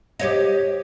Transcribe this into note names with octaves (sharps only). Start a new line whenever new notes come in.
G4 C#5 D#5